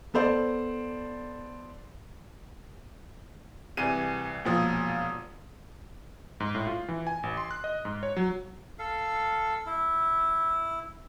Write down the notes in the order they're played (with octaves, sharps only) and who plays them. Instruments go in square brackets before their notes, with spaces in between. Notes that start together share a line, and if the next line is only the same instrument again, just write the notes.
[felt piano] B3 A4 C5 D5
[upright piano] C2 E3 G#4 D#7
E1 A#2 F3 D#6
[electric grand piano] G#2
A2
F4
E3
G#5
A1
C6
F#6
D#5
G#2
C#5
F#3
[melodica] A4 F5
E4